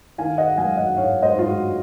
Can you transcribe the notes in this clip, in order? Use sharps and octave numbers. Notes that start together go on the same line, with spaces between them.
D#3 F5 G#5
D#5 F#5
F#3 F5 G#5
D#5 F#5
G#2 C#5 F5
C5 D#5
G#2 F4
F#4